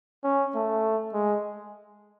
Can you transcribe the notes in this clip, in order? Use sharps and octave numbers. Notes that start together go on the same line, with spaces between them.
C#4
A3
G#3